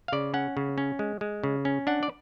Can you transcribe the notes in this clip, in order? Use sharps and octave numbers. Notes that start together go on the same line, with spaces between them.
F5
C#3 D5
C#4 F#5
C#3
C#4
G#3
G#3
C#3
C#4
D4 F#5
D5